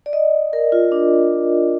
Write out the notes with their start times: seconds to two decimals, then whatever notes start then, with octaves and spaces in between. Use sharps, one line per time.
0.06 D5
0.13 D#5
0.53 A#4
0.72 F4
0.92 D4